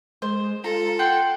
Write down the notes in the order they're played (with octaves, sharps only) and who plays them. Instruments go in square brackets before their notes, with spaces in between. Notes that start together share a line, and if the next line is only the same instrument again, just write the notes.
[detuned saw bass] G#3 [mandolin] C5
[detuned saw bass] F4 [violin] A4 [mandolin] A#5
[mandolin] F#5 G5 C6